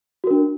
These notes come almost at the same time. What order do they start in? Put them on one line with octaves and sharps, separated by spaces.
F#4 A#4 D4